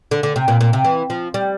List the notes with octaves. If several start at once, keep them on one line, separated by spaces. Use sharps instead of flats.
D3
D3
C3
A#2
A#2
C3
E3
F3
G3